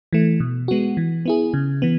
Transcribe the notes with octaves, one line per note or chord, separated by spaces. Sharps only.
E3 A3
B2
G#3 B3 F#4
E3
B3 E4 G#4
C#3
E3 B3